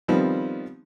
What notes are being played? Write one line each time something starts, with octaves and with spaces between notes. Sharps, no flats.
D#3 F3 G3 B3 C4